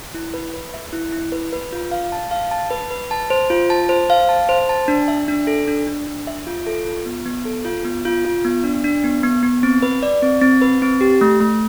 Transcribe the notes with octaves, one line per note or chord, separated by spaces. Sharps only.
E4
B4
B4
E5
E4
E4
B4
B4
F4
F5
A5
F5
A5
B4
B4
A5
C5
F4
A5
C5
F5
A5
C5
A5
D4
E5
D4
A4
D4
D4
D4
E5
F4
A4
F4
B3
B3
A4
F4
B3
F4
F4
B3
D4
D4
B3
B3
B3
C4
B4
D5
C4
C4
B4
C4
G4
A3
A3